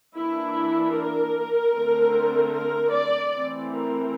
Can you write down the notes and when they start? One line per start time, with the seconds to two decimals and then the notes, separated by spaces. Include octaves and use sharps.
0.14 E3 A#3 D4 E4
0.94 A#4
1.73 D3 A3 C4
2.53 A#4
2.92 D5
3.31 E3 A3 C4
3.71 A#4